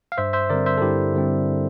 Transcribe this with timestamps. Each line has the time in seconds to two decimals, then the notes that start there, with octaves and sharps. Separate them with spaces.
0.12 F5
0.18 G2 C5 E5
0.33 C5 E5
0.50 D3 G3 C4 A#4 D5
0.66 C5 E5
0.78 A4
0.82 G2 E4 G4
1.14 D3 G3 C4